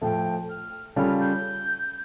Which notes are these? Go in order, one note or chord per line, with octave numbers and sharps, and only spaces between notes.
A2 F3 A3 G5
F6
C#3 G3 C#4 F4 A4 F6
G6